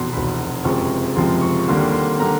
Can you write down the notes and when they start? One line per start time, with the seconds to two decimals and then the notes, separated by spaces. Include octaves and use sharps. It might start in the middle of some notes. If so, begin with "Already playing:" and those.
Already playing: F1 E2 B2 C6
0.12 F1 E2 B2 B5
0.64 F#1 F2 C3 F3 G#3 C#6
1.16 F#1 F2 C3 F3 G#3 C6
1.41 C#6
1.59 C#6
1.68 D#2 D3 G3 A#3 C6
1.93 C6
2.19 D3 G3 A#3 A#5